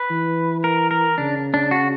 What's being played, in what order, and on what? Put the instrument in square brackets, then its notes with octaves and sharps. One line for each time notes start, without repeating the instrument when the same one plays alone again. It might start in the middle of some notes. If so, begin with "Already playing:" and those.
Already playing: [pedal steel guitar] B4
[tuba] E3
[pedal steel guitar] A#4
A#4
[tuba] C#3 [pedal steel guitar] D4
[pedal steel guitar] D4
F#4